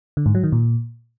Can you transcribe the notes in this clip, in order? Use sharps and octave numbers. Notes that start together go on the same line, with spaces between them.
D3
G#2
F#3
D#3
A#2